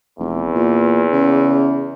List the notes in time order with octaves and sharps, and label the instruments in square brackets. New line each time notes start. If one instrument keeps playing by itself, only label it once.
[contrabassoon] F1 [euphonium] E2
[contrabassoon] A#2
C#3